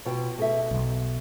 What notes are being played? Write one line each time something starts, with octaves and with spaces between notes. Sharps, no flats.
B2 F4 G5
B2 A4 E5
B1